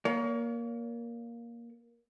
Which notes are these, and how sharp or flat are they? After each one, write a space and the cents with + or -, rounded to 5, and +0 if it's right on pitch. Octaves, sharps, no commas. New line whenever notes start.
A#3 +10 C#5 +45